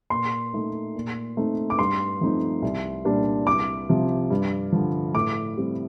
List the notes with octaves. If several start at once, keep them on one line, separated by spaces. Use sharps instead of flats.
A#2 C6
A3 D#4
A#2
A3 C4 D#4
D6
G2 C6
F3 A3 C4 D#4
C2
A#2 G3 D4
C2 D6
C3 F3
G2
D3 F3
A2 D6
G3 C4